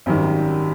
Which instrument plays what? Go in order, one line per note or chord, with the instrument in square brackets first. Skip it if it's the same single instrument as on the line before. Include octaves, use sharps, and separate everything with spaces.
[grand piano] G#1 F#2 D#3 G3